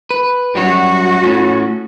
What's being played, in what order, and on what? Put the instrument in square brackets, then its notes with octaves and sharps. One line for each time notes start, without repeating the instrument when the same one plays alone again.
[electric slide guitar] B4
[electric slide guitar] F#2 F#3 G3 [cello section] F#4
[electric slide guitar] A2 C#4